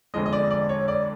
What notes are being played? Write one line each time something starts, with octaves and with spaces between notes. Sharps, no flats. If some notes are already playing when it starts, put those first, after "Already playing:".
G1 F2 D3 F3 G#3 D#5
D#5
D5
D5
C#5
D5